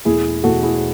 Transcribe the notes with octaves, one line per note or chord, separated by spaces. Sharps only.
E2 B2 A3 E4 G#4
E2 B2 A3 F#4 A4
E4 G#4